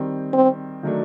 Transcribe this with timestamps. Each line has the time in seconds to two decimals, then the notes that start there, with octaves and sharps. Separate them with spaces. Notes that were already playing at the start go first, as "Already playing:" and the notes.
Already playing: D#3 G3 C4
0.33 C4
0.83 D#3 F#3 A3 D4